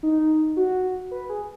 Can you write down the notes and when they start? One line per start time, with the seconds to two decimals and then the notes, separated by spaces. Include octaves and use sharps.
0.03 D#4
0.57 F#4
1.11 B4
1.30 G#4